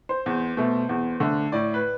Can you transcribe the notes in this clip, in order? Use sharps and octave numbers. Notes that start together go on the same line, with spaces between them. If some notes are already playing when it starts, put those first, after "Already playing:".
C5
E2
B2 A3
E2
D3 A3
A2 D5
B4